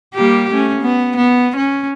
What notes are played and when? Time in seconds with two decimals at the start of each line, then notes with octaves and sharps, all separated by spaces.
0.14 G3 A#3 G4
0.51 A3 C#4
0.81 B3
1.17 B3
1.56 C#4